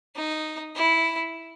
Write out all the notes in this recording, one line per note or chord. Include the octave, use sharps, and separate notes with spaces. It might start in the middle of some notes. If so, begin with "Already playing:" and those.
D#4
E4